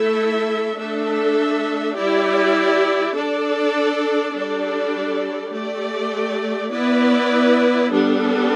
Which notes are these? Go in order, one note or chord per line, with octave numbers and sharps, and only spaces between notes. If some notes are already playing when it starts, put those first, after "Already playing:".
Already playing: A3 E4 A4 E5
A3 D4 A4 E5
G3 E4 G4 D5
D4 A4 D5
G3 D4 A4 D5
A3 G4 D5
B3 E4 B4 D5
G3 B3 D4 A4